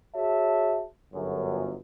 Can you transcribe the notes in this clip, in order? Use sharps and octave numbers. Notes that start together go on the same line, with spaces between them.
F#4 G#4 C#5 E5 A5
G1 F#2